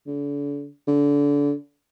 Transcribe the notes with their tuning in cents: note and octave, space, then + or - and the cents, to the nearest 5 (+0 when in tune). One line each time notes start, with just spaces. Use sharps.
D3 -40
D3 -30